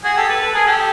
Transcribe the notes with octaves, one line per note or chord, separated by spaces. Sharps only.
F#4 G#4
G4 A4
A4 B4
A4 B4
G#4 A#4
G4 A4